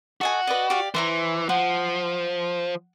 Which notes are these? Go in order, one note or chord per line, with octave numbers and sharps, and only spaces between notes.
F#4 A4 D#5 G#5
B4 D5 D#5
G4 D5 F5
E3 C5 E5 A#5
F3 F#5